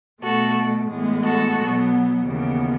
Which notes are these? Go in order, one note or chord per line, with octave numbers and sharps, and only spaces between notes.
B2 A3 F#4 A4
A2 E3 G#3 B3
F#4 A4
B2 F#3 B3
D#2 C#3 E3 B3